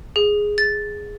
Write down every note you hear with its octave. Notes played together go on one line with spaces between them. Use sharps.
G#4
A6